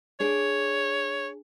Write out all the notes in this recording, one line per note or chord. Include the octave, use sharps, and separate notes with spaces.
D4 G#4 C#5 D5